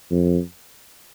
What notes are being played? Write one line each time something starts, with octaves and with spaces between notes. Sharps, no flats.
F2